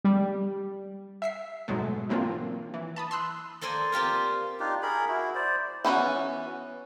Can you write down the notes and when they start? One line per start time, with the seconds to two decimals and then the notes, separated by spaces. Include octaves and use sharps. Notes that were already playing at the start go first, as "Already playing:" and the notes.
0.04 G3
1.22 E5 B6 C7
1.68 G#2 B2 F#3 G#3 A3
2.09 E3 F#3 A#3 C4 D4 F4
2.74 E3
2.96 A5 B5 D#6
3.11 C6 E6 F#6
3.61 A#3 A4 C5 D5 G#5
3.92 C4 F4 G4 A#4
4.60 D4 D#4 F4 G4
4.82 G#4 A#4 B5
5.09 E4 F#4
5.35 C5 D5
5.85 E3 B3 C#4 F#4